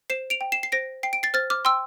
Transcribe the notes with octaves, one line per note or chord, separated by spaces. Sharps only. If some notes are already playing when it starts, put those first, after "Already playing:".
C5 C7 E7
D7 F7
G5
C7 E7
C7
C5 A#6 D7
G5 C7
D7
A6 C7
C5 F6 A6
D6 F6
G5 C6 E6